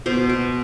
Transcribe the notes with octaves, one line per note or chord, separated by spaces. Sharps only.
B2 C5
B2